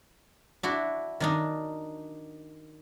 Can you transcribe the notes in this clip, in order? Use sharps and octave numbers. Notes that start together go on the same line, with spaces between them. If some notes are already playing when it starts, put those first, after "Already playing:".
D4 E4 F#4
D#3 D4 D#4